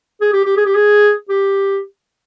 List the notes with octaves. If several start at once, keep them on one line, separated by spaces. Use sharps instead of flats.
G#4
G4
G4
G#4
G4
G#4
G4